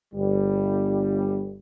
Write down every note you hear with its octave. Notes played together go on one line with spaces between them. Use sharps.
G1 G3